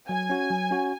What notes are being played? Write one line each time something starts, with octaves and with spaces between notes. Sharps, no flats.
F#3 G#5
C#4 F#4
F#3
C#4 F#4